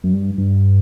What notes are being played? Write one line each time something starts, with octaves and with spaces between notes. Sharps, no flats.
F#2
G2
G2